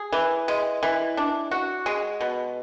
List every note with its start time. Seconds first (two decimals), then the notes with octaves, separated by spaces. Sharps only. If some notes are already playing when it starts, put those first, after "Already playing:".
Already playing: G#4
0.13 E3
0.48 G#3
0.83 E3
1.17 D4
1.51 F#4
1.86 G#3
2.21 B2